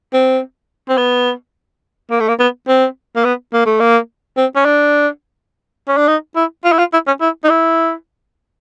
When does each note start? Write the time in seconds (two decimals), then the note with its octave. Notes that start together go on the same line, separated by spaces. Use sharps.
0.13 C4
0.89 C4
0.97 B3
2.11 A#3
2.20 A3
2.28 A#3
2.39 B3
2.68 C4
3.16 A#3
3.25 B3
3.53 A#3
3.66 A3
3.80 A#3
4.37 C4
4.56 C#4
4.65 D4
5.88 C#4
5.97 D4
6.08 D#4
6.36 E4
6.64 F4
6.72 E4
6.79 F4
6.93 E4
7.07 C#4
7.21 E4
7.44 D#4
7.49 E4